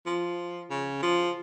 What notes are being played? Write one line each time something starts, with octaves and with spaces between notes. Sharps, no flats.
F3
C#3
F3